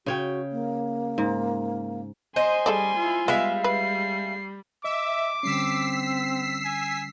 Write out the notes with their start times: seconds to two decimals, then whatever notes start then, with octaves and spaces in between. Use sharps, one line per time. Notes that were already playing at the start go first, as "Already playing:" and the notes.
0.06 C#3 F#4 C#5 G5
0.52 A#3
1.18 G#2
2.36 C5 D#5 G#5 C6
2.66 G3 G#4 A4 D5
2.97 E4 F4
3.28 G3 G#3 B3 E5 F5
3.64 B4 C7
4.84 D#5 E5 D6
5.43 D3 G3 C4 C#4 E6 B6 C7
6.65 G#5